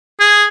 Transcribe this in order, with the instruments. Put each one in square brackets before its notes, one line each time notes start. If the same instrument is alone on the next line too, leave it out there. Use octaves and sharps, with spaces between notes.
[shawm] G#4